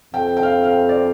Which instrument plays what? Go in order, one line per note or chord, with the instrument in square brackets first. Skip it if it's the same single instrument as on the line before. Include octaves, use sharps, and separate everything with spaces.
[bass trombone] F2 [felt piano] G5
[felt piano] G5
F5
F5
G5
D5